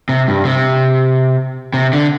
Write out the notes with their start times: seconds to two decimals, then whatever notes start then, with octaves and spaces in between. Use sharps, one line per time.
0.09 C3
0.28 G2
0.45 C3
1.74 C3
1.93 D3